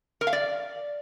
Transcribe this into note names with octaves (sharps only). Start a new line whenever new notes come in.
A#4
F5
D5